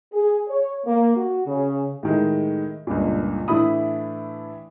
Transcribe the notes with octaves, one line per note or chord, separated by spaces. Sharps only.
G#4
C#5
A#3
F#4
C#3
A2 D#3 G#3
C#2 G2 A#2
A2 E3 D4 E4 B5 D#6